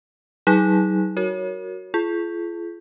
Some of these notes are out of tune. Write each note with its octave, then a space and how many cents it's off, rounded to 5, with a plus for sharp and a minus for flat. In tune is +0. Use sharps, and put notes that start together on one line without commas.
F#3 +40 D#4 +35 G#4 +0
F#4 +0 A#4 -5 C#5 +0
F4 -35 G#4 +40